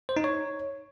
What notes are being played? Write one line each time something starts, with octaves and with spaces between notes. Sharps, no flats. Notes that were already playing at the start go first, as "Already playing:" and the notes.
C5
D#4
C#5